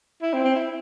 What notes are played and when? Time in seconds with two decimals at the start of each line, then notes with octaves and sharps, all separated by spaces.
0.22 E4
0.33 C4
0.44 C4
0.56 E4